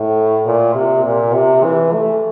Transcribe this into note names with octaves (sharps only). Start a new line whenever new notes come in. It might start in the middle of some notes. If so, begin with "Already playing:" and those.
Already playing: A2
A#2
C3
A#2
C3
E3
A3